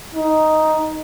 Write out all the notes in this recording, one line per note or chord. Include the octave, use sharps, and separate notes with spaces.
D#4